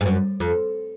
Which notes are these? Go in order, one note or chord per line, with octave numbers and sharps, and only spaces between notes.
G#2
F#2
F2